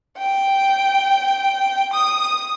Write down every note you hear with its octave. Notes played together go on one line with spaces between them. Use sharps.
G5
D#6